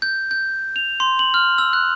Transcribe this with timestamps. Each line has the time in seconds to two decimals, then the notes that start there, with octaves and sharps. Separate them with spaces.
0.02 G6
0.31 G6
0.76 F7
1.00 C6
1.19 F#7
1.34 F6
1.58 E6
1.73 F#6